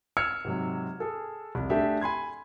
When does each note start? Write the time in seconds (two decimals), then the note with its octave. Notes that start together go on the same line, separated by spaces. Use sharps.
0.17 E6 F6 G#6 C#7
0.45 G#2 C3 F#3
1.00 G#4 A4
1.55 C2 F2
1.70 A3 D4 G4 G#4 E5
2.01 G#5 B5 C6 G#6